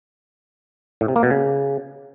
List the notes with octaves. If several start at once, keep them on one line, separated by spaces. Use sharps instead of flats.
A2
C3
A#3
B2
C#3